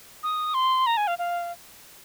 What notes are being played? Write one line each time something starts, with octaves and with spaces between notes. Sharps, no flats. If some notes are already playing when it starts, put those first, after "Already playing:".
D#6
C6
A#5
G#5
F5
F5